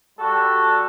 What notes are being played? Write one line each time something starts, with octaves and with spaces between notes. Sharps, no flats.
G3 F#4 A4